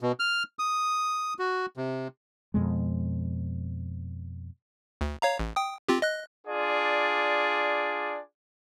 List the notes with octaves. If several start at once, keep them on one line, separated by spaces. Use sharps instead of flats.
B2
F6
D#6
F#4
C3
F2 B2 G#3
D2
C#5 F5 A#5
A1
G5 D#6
C4 F4 G4
D#5 F#6
D4 F4 G#4 D5